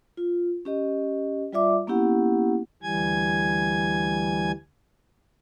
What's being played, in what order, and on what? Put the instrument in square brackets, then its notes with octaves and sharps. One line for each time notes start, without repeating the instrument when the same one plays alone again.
[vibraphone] F4
C#4 G4 D#5
G3 F4 D5 E5 D6
A#3 B3 C#4 E4 G4 F#5
[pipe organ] D2 E3 G3 G#5 G#6